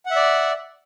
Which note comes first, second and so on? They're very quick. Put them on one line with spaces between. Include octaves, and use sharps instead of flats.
F#5 E5 D5